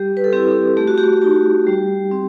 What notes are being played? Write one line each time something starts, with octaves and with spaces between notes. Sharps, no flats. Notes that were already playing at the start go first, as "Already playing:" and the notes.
Already playing: G3 G4
B4
A4
C4 E4 G4
A3 G4
F#4
G4
D#4 F#4
G3
C4